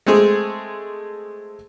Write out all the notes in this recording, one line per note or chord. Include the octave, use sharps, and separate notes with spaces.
G#3 A3 C4 G#4